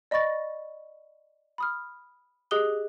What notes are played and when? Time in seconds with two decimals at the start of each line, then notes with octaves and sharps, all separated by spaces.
0.11 D5 D#5 B5 C#6 A6 A#6
1.58 B5 D#6 F6
2.51 G4 G#4 D#5 D#6 F#6 G7